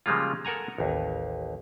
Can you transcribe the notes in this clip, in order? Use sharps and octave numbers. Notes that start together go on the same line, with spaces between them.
C#3 F3 G3 G#3 A#3 F4
A4 A#4 F#5 G#5 A#5
A1 D#2